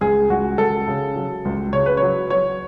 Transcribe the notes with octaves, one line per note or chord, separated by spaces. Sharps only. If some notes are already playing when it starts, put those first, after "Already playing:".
C#2 G#4
C#2 F#4
C#2 A4
C#3
F#3
C#2
C#3 C#5
B4
C#5
F#3
F#3 C#5